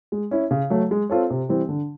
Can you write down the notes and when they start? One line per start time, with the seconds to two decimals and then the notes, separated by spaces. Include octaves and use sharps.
0.12 G#3
0.31 C#4 E4
0.51 C#3
0.70 F#3 A3
0.91 G#3
1.10 C4 F4 A4 C#5
1.30 C3
1.49 E3 G3 C4
1.69 D3